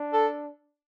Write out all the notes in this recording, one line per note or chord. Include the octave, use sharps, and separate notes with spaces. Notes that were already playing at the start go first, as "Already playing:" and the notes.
Already playing: D4
A4